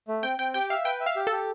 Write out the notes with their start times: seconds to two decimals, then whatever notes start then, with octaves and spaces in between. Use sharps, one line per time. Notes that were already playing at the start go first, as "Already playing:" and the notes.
0.08 A3
0.23 C4 G5
0.38 C4 G5
0.54 G4 G5
0.70 E5 F5
0.85 B4 G5
1.01 E5
1.06 F5
1.16 G4
1.27 G4 A4